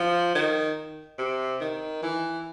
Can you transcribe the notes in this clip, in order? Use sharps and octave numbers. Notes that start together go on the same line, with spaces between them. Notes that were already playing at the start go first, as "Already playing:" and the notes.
Already playing: F3
D#3
C3
D#3
E3